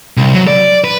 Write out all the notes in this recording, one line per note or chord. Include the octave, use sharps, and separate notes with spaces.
C2
F#3
D5
B4